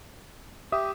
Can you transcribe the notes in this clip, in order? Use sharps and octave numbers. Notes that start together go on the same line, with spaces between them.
G4 E5 D#6